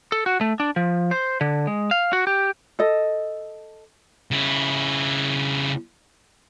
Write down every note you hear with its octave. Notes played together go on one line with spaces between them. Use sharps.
A4
F#4
A3
D4
F3
C5
D3
G#3
F5
F#4
G4
A4 D#5
C#3 E4